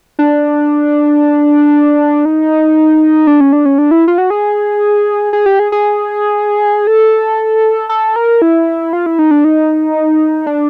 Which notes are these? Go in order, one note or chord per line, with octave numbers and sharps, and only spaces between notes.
D4
D#4
D4
C#4
D4
C#4
D4
E4
F4
F#4
G#4
G#4
G4
G#4
G#4
A4
A4
A#4
E4
F4
E4
D#4
D4
D#4
D4